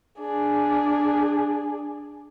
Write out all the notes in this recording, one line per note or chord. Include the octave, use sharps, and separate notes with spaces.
D4 G#4